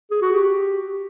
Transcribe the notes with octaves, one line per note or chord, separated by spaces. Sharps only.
G#4
F#4
G4